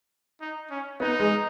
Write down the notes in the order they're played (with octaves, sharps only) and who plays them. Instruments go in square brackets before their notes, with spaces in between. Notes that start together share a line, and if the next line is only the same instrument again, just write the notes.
[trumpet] D#4
C#4
[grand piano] B3 [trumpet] D#4
[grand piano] G#3